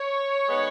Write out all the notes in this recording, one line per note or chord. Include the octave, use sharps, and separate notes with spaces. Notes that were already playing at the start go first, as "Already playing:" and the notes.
Already playing: C#5
D#3 G#3 B3